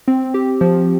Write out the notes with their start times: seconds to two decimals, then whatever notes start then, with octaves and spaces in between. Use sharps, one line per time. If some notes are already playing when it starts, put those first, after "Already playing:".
0.08 C4
0.34 G4
0.61 F3